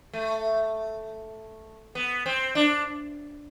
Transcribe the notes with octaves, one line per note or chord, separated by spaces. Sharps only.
A3
B3
C4
D4